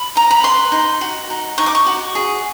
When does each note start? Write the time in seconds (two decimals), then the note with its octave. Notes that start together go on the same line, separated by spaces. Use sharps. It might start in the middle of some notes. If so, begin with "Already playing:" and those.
Already playing: B5
0.15 D#4 A#5
0.31 B5
0.43 B4 C6
0.72 D#4
1.01 F#4
1.30 D#4
1.58 D#4 C#6
1.66 D6
1.75 C#6
1.86 F#4
2.15 G#4